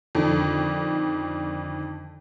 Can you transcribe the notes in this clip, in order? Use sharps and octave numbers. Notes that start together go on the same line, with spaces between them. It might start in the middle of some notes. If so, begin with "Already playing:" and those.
F2 D3 D#3